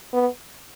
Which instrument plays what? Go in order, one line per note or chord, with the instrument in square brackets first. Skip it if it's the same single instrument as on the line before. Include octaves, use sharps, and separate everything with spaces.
[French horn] B3